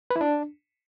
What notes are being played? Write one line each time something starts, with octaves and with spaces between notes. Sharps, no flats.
B4
E4
D4